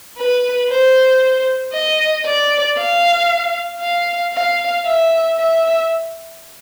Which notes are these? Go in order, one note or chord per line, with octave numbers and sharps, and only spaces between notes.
B4
C5
D#5
D5
F5
F5
F5
E5
E5